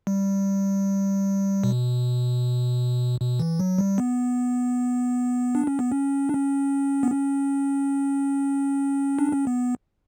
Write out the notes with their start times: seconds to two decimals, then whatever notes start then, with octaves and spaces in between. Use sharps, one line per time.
0.07 G3
1.64 B2
3.21 B2
3.39 E3
3.59 F#3
3.78 G3
3.98 B3
5.55 D4
5.67 C#4
5.79 B3
5.91 C#4
6.29 D4
6.33 C#4
7.03 B3
7.12 C#4
9.19 D4
9.32 C#4
9.47 B3